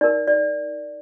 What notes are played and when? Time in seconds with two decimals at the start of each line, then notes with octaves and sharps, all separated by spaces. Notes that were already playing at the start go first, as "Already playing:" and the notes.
0.01 D#4 A#4 D5
0.28 D5